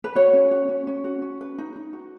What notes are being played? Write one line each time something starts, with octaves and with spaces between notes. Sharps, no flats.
B4
F#4 C#5
C#4
F#4
C#4
C#4
F#4
C#4
B4
D#4
D#4
F#4